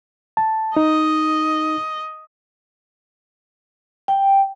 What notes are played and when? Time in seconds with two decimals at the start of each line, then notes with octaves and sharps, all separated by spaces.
0.37 A5
0.77 D#4 D#5
4.08 G5